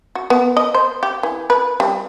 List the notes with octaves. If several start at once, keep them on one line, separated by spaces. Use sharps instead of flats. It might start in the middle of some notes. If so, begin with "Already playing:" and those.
F#4
B3
D#5
C5
G4
E3
B4
G3